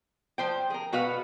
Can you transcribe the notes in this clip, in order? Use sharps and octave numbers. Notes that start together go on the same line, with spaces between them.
F3 C5 G5
G#4 A#4
B2 F#4 B4 F5